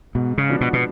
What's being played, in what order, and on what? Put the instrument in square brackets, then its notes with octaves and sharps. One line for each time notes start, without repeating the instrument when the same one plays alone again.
[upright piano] G#2 [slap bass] B2
[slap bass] C#3
[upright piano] F3 B3 D4 F#4
[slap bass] B2
B2